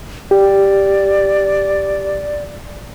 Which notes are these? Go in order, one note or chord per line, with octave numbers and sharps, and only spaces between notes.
G4 D5